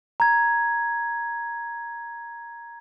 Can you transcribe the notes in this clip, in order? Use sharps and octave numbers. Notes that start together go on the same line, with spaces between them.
A#5 G#6